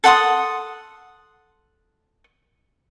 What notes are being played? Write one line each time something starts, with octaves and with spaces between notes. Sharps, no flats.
A4 F#5 C6 D#6